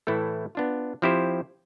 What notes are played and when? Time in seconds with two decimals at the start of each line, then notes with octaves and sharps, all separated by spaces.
0.07 A2 E3 A3 E4 A4
0.55 B3 D4 F4
1.02 F3 C4 E4 G4 C5